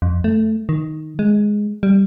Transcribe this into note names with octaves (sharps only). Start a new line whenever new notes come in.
F2
A3
D#3
G#3
G3